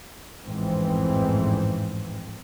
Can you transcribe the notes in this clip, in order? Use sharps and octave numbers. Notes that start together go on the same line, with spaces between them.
A1 F2 G#2 E3 C4